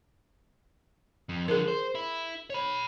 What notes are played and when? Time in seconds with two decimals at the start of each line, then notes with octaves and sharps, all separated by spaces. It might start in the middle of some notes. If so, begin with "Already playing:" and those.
1.29 F2
1.48 D3 F3 G#4 A#4
1.68 C5
1.95 E4
2.50 C#5 B5